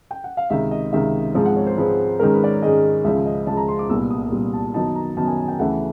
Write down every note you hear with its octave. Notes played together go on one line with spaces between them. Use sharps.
G5
F#5
F5
C#2 C3 D#3 E5
D#5
C#2 C3 D#3 E5
G#2 F3 G#3 C4
F#5
C#5
C5
G#2 F3 G#3 C4 B4
G#2 D#3 G#3 C#4 A#4
B4
D5
C#5
G#2 D#3 G#3 C#4 D#5
C#2 C#3 F3 E5
D#5
C#2 C#3 F3 A5
A#5
C6
D6
C2 A#2 G3 B3 E6
D#6
C2 A#2 G3 B3
A5
F#2 D#3 F#3 B3 D#4 A5
A#5
F#2 D#3 F#3 B3 D#4 A5
G#5
G#5
G5
D2 C#3 E3 A3 F#5